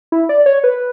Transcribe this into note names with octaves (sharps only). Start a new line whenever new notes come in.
E4
D5
C#5
B4